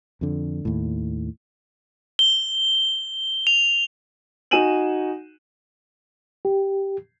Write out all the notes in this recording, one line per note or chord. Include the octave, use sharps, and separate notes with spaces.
F2 D3
D#2 A2
G7
F7
D#4 F#4 G#5 D#7 E7 F#7
G4